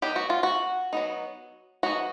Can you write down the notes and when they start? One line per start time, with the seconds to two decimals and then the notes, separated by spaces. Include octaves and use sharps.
0.02 F#3 B3 D#4 G4
0.16 F#4
0.30 F4
0.43 F#4
0.93 F#3 B3 D#4
1.83 F#3 B3 D#4 F#4